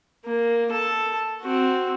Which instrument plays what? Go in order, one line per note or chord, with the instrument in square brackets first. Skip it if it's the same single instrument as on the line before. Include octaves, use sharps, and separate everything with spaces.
[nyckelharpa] A#3
A4 A5
C4 F#4